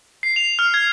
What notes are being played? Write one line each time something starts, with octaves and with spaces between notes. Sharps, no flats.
C7
F7
F6
G#6